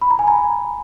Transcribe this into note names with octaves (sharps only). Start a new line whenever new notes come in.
B5
A#5
G#5
A#5